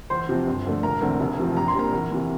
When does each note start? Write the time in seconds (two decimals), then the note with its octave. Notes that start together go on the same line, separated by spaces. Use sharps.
0.10 E2 C5 C6
0.29 C3 F3 C4
0.47 G1
0.65 F2 D3 A3
0.83 E1 A#4 A#5
1.01 E2 D3 A3 C4
1.20 F1
1.39 E2 C3 F3
1.57 A#1 A#5
1.68 C6
1.75 A#2 G3 C4 A#4 A#5
1.93 E2
2.11 C3 E3